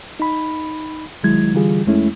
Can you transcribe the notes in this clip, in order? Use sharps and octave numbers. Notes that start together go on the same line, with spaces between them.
D#4 B5
C2 D#3 F#3 G#3 E4 G#6
D3 E3 G3 F4 G#4
E2 G#3 A3 C#4 E4